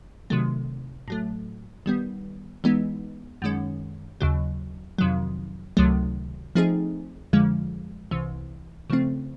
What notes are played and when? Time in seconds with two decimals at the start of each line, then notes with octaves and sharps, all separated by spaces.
0.30 C3 D#3 F#3 A3
1.08 A2 F#3 A3
1.86 D#3 G3 B3
2.64 E3 G#3 B3 D#4
3.42 F#2 D#3 G#3 C#4
4.21 D#2 C#3 F#3
4.99 F2 C3 D#3 F#3
5.77 C#2 C3 D#3 F#3 A3
6.55 F3 A3 C4 D#4 G#4
7.33 F2 D3 F3 G#3
8.11 C2 C3 E3
8.90 C#3 F3 A3 C4